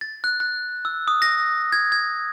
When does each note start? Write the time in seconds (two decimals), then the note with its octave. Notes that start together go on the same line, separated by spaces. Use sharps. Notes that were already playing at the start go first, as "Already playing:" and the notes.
0.01 A6
0.24 F#6
0.40 F#6
0.85 E6
1.08 D#6
1.22 A#6
1.72 G#6
1.92 G#6